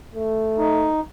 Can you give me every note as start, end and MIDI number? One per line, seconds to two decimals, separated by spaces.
0.15 0.91 57
0.58 1.00 63